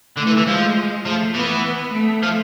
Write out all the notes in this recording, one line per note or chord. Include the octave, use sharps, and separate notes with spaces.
D3 A3
E3
E3
F3 G#3
F3 A3
E3 B3
A3
F3